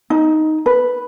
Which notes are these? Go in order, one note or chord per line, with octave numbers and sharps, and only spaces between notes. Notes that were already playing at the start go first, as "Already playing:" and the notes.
D#4
B4